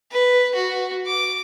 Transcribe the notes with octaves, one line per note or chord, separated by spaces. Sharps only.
B4
F#4
D6